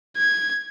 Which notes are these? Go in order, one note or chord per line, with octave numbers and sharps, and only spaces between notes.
G#6